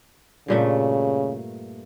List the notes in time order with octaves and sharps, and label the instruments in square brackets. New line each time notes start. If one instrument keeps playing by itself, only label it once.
[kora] G2 A#2 A3 [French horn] C#3